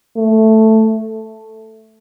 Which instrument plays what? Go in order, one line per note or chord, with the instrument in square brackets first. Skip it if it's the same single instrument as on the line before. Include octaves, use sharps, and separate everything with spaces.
[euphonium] A3